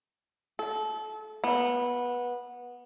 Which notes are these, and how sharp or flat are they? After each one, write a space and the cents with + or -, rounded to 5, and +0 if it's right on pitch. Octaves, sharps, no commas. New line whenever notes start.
A4 -30
B3 -15